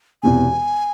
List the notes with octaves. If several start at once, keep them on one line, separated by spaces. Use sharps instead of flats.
E1 E2 C3 G#5